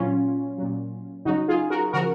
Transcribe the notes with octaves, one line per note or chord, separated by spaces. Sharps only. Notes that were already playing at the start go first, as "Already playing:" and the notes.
Already playing: A#2 F#3 C#4 F4
A#2 F#3
C#3 F#3 D#4 F#4
F4 G#4
F#4 A#4
C#3 F3 F#4 A#4